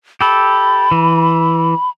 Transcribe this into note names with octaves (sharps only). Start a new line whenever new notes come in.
G4 A4 B5
E3